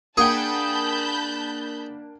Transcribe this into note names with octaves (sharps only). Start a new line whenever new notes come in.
A#3 D4 G#4 F#5 G5 A5 B5 G6